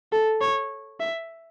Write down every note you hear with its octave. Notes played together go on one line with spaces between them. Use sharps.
A4
C#5
E5